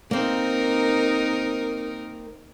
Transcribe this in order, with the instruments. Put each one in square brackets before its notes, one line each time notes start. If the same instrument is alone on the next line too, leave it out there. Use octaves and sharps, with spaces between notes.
[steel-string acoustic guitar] A#3 C4 [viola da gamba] D#4 A#4